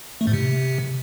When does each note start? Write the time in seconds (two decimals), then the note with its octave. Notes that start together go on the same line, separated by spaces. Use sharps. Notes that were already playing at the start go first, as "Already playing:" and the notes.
0.21 A3
0.27 G#2
0.33 C3